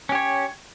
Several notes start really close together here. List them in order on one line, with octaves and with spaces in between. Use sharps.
C#4 G4 C#5